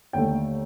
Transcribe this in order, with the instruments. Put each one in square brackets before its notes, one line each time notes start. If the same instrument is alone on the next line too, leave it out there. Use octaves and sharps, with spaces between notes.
[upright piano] D#2 D3 A3 G5